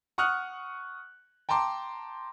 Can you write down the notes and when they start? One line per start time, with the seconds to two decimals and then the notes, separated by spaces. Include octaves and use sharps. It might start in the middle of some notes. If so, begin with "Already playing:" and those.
0.18 F#5 C#6 D#6 F6 F#6
1.49 G5 A5 A#5 C6 D6